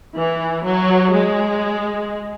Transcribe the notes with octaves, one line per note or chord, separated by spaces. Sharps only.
E3
F#3
G#3